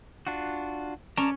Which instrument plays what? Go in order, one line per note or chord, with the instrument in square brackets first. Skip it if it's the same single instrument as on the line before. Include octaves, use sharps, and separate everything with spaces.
[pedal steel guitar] D4 F4 F#4
[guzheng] C#4 [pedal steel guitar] D5 A5 A#5